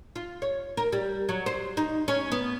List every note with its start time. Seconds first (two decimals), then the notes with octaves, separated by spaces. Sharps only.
0.16 F4
0.42 C#5
0.77 A#4
0.92 G3
1.29 F#3
1.46 C5
1.77 D#4
2.08 C#4
2.32 B3